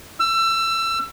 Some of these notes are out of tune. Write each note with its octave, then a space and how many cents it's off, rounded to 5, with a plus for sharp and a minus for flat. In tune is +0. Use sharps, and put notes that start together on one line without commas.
E6 +25